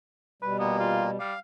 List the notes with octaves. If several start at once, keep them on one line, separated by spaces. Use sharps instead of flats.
B2 G3 B4
D#2 A#2 A#3 B3
F4
G3 F5